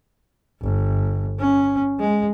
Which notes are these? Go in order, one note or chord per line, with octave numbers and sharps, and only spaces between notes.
G1
C#4
G#3